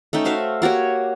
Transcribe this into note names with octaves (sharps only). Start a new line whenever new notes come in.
A3 C#4 D#4 G5
F#4 C5 E5 F5
A#3 F#4 G4 C#5